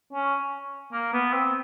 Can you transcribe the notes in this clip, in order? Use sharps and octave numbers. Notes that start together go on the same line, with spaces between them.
C#4
A#3
B3
C4